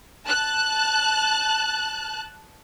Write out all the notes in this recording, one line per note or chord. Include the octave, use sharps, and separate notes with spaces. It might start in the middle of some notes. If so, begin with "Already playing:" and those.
A5 F#6